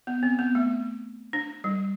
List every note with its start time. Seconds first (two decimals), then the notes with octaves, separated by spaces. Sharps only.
0.07 B3
0.23 C4
0.39 B3
0.55 A3
1.33 D4
1.64 G3